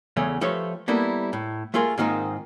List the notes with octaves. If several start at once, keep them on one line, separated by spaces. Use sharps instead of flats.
E2 C#3 A3 C#4
F3 A3 G4 B4 C#5
G3 A#3 B3 E4 A4
A2
A3 A#3 F4 G#4 A#4
G#2 D#3 A#3 C4 D#4 F4